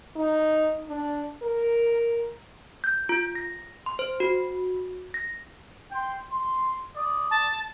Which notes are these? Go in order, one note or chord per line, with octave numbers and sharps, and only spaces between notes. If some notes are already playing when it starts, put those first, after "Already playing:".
D#4
D4
A#4
G6
F4
A#6
C6
C5
F#4
A#6
G5 C6
C6
D5 D#6
A5